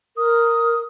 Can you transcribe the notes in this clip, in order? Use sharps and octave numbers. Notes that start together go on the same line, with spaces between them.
A#4 D#6